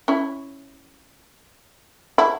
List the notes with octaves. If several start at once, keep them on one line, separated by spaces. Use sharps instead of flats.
C#4 E4
E4